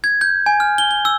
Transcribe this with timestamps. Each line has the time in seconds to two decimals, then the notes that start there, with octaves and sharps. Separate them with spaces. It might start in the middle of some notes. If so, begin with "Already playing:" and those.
0.04 G#6
0.21 G6
0.46 G#5
0.60 F6
0.78 G7
0.91 G7
1.05 E6